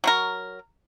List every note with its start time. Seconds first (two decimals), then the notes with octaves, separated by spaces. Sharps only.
0.04 F#3 F#4 A#4